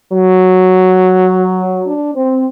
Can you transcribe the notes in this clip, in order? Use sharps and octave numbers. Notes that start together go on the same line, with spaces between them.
F#3
D4
C4